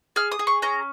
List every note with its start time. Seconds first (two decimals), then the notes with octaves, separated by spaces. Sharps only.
0.16 G#4 F6
0.32 D#6
0.39 G#4
0.47 C#6
0.62 C#4 A#5